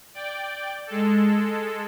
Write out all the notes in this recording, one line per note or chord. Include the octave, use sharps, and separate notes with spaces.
D5 G5
G#3 A4